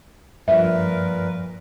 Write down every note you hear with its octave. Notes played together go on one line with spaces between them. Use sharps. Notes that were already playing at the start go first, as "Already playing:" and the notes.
G2 A#2 F3 A#4 B4 E5